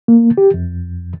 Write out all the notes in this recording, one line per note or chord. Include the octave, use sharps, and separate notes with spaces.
A#3
G4
F2